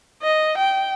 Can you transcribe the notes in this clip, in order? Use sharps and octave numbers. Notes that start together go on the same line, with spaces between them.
D#5
G5